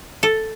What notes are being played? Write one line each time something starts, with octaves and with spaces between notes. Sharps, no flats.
A4